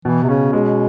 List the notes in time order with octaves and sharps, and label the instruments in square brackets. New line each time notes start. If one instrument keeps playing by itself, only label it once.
[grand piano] B2 [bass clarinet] E3
[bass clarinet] C3
[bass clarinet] C#3 [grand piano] C#4
[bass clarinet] B2 [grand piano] G#3